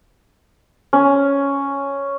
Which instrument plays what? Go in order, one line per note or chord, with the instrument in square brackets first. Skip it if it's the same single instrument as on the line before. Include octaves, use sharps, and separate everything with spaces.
[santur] C#4